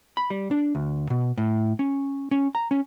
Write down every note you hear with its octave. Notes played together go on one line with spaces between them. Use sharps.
B5
G3
D4
D2
B2
A2
C#4
C#4
A#5
C#4